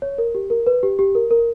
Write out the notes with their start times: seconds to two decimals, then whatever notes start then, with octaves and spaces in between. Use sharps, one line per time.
0.02 C#5
0.18 A#4
0.35 G4
0.50 A#4
0.67 B4
0.83 G4
0.99 G4
1.15 A#4
1.31 A#4